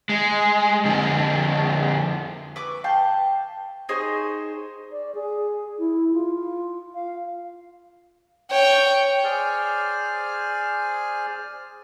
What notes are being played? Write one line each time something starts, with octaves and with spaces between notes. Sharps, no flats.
G#3
F2 D3
B4 C#6 D6
F5 G5 A5
D#4 G#4 C5 C#5
D5
G#4
E4
F4
F5
C#5 G5
G#4 C5 D5 G#5 F6